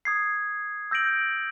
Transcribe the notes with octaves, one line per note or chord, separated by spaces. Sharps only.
D#6 G#6 C7
E6 G6 A#6 D7 F#7